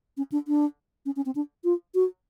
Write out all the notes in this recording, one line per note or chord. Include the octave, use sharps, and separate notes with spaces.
C#4
D4
D4
C#4
C#4
C4
D4
F4
F#4